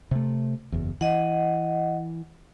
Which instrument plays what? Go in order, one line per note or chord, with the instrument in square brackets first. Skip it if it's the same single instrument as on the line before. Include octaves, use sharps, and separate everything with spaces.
[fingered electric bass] C3 A3
F#1 E2
[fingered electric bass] E3 [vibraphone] D#5 F#5